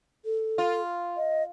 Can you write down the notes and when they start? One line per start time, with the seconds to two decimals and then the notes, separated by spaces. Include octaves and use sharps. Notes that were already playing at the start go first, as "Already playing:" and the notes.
0.25 A4
0.58 F4
1.17 D#5